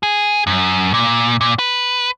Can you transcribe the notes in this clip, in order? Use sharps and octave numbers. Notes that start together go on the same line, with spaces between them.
G#4
F#2
A#2
A#2
B4